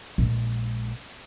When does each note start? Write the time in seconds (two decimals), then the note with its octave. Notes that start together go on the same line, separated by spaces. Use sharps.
0.18 A#1 G#3